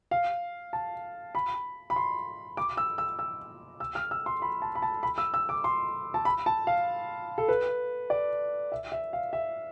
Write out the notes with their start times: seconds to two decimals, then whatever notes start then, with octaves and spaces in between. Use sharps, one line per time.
0.11 F5
0.73 A5
1.35 B5
1.90 B5
1.96 C6
2.57 D6
2.77 E6
2.98 E6
3.19 E6
3.80 E6
3.95 F6
4.11 E6
4.26 C6
4.42 B5
4.62 A5
4.75 B5
4.82 A5
5.03 B5
5.18 E6
5.34 E6
5.49 D6
5.64 C6
6.14 A5
6.25 B5
6.46 A5
6.67 F5
7.38 A4
7.48 B4
8.10 D5
8.72 E5
8.92 E5
9.13 F5
9.33 E5